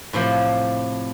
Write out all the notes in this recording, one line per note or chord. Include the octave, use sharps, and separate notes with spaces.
A2 C3 F3